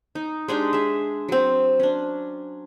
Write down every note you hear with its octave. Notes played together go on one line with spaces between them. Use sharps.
D#4
G#3 D4 D#4 G4
G#4 E5
F#3 C4
C#4 D4